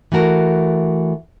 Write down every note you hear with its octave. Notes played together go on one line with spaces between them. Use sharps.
E3 A3 F#4 A#4